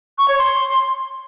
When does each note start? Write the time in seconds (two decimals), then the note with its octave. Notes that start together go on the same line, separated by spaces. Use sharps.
0.18 C#6
0.28 C#5
0.38 C6